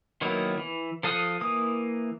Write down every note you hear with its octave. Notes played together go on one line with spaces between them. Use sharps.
D#3 F#3 A#3 B3 E4
E3
F3 A4 F5 D#6 F#6
E3 A#3 D#6